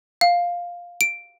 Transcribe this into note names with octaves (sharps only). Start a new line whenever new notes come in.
F5
D7